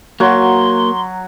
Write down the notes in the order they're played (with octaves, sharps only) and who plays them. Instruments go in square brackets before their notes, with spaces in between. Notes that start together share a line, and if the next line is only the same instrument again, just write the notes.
[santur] F#3 [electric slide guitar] A#3 F#4 [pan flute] C6